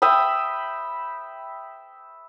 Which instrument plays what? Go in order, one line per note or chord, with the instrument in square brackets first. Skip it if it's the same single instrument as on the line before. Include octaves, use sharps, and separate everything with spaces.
[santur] E5 G5 B5 D#6